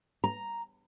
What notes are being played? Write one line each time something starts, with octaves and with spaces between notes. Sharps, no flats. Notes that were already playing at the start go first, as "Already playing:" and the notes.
A#5